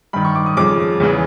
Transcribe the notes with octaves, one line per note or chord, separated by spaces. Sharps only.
G2 D#3 B5
C#6
D6
D#6
F2 C#3 F3 D6
E2 C#3 E3